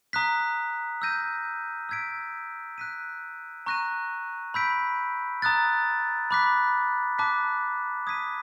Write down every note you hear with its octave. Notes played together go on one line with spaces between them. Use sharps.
A#5 D#6 F#6 B6
E6 G6 A#6 D#7
E6 G#6 B6 D7
F#6 B6 D#7
A#5 C#6 F#6 A#6 D#7
B5 E6 G6 B6 D7
A#5 D#6 F#6 A6
B5 D6 F#6 B6
A5 D6 F#6 B6
D#6 G#6 B6 D#7